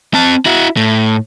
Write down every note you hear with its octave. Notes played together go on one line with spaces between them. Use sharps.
C4 A5
E4 F#4
A2